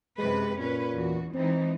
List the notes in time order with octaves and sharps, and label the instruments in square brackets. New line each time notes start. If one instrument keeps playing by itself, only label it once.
[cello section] F#2 C3 B4 [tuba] G#3
[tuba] A#2 [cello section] C#4 B4
[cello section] E2 F#4
[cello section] E3 G#3 D#4 [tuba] C4